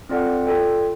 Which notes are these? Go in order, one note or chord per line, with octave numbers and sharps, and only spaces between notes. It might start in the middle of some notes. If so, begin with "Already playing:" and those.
C4 F4 A4 D5 F#5
F4 A4 D5 G5